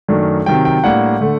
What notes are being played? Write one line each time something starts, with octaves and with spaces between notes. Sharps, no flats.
F#2 D#3 A3 D4
C3 D#3 F#3 G5
G5
A2 G3 A#3 D4 F#5
D3 A3